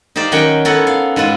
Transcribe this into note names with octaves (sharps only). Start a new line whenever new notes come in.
D#4 G4 C5 D5 F5
D#3 F#3 C#4 A#4 F#5 G5
B3 E4 A4 A#4 C#5
F5
G#2 B3 E4 F4